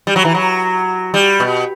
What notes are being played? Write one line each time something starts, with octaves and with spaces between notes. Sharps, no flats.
G3
F#3
E3
F#3
G3
B2